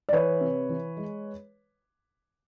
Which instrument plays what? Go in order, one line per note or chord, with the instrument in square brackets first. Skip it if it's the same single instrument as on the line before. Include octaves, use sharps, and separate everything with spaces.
[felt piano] D5
E3 B4 C#5
C3
E3
G#3